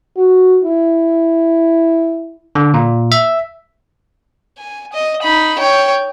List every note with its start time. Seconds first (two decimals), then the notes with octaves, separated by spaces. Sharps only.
0.17 F#4
0.64 E4
2.55 D3
2.74 A#2
3.12 E5
4.58 G#5
4.93 D#5
5.22 D#4 B5
5.58 C#5 G5